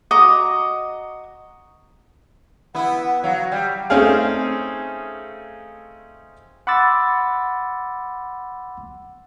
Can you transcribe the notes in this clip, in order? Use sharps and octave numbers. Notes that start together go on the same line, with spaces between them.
F#4 D#5 A#5 D6
B3 E4 F#5
F#3 F5
G3 G5
A3 C4 C#4 D#4 G#4 F5
F#5 B5 C6 D6 E6 A6